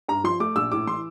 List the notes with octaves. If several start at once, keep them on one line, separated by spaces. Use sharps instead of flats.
G2 A#5
F3 C6
A3 D6
A#1 E6
A2 D6
E3 C6